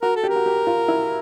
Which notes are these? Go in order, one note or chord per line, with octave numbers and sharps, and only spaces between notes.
F#4 A#4
A4
G4
A#4
F#4
G4
F4
E4